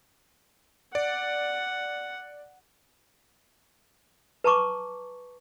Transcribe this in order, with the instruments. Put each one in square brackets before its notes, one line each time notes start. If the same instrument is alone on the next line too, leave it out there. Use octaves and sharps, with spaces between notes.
[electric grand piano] D5 [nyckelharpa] F#5
[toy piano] B4 A5 A#5 C#6 D6